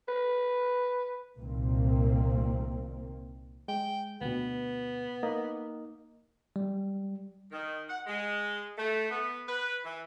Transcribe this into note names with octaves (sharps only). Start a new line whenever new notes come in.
B4
C2 A#2 D#3 A#3 C4
G#3 G5
D2 B2 B3
A#3 D#4 D#5
G3
D#3
F#5
G#3
A3
B3
B4
E3